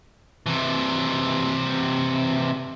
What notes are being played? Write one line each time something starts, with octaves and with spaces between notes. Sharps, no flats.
C3 E3